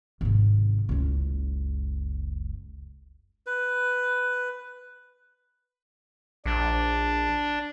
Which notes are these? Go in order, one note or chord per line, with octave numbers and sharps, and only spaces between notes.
G#1 C3
F#1 C#2
B4
A#1 D4